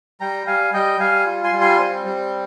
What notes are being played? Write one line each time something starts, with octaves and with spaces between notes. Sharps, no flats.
G3 G5 A#5
G3 F5 G#5
G3 D#5 G5
G3 F5 G#5
F4
G#5 C6
G3
G#5 C6
C4
G3